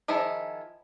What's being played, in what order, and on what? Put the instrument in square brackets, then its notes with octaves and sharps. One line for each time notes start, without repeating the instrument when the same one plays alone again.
[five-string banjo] D#3 F3 E4 G#4